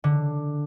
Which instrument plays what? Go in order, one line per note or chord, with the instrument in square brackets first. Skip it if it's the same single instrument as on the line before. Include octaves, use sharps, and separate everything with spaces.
[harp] D3